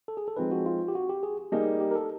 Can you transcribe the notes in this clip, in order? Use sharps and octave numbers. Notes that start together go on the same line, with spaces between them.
A4
G#4
A4
F3 G#3 C4 D#4 B4
F#4
F4
G4
F#4
G4
G#4
G3 A#3 D#4 G#4
G4
A#4
A4